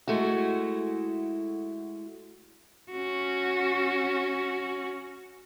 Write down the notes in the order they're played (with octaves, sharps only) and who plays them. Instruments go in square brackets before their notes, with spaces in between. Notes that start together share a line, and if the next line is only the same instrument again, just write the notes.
[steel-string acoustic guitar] G#3 A3 E4 F#4
[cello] C#4 F#4